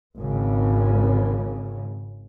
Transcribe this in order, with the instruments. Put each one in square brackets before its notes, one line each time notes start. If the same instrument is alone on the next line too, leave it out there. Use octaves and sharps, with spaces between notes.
[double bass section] G#1 C#3